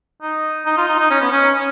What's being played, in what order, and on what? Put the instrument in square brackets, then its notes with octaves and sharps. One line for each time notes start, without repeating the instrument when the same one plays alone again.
[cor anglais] D#4
D#4
F4
D#4
D#4
C#4
B3
C#4
C#4